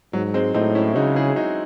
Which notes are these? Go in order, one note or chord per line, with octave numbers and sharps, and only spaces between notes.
G#2 F#3
G#3 C4
A2 C4 D#4
C#4 E4
C#3 D#4 F#4
E4 G#4
D#4 F#4